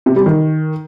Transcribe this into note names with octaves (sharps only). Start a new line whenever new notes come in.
C3
G3
D#3